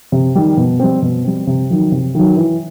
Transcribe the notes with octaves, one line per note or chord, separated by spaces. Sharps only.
C3
D#3 G3
B2
G3 C4
B2
G3 C4
C3
D#3 F#3
C3
D#3 F#3
E3